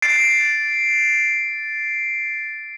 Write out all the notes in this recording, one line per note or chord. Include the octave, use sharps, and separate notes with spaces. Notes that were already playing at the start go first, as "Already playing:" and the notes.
A6 C7 D7